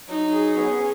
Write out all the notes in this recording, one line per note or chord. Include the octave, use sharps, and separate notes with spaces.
F#3 D#4
G#4
B3 C#4